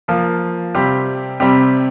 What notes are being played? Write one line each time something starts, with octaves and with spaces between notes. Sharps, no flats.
F3 A#3 F4
C3 G3 C4 G4
C3 G3 C4 G4